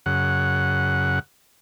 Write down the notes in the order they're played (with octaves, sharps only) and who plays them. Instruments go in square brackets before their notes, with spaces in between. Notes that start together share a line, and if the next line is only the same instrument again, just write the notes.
[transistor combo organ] F#2 C#3 F#5